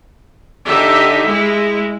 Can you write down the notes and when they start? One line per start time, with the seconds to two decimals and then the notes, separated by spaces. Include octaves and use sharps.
0.66 D3 D#4 G4 E5
1.25 G#3 E4